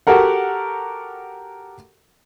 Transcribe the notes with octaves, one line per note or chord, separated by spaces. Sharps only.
F#4 G4 A4 A#4 F#5